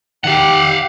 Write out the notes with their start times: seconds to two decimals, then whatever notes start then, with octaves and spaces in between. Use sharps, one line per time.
0.24 D#3 G4 F5 F#5